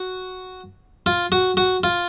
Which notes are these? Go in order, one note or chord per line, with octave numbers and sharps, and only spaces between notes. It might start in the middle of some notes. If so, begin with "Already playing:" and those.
Already playing: F#4
F4
F#4
F#4
F4